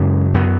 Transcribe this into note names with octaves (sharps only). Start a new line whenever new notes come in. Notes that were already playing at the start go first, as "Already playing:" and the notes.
Already playing: F#2 C#3 G#3 C#4
F#2 F#3 B3